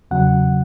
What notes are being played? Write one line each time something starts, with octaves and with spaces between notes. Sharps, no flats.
E2 C#3 F#3 F#5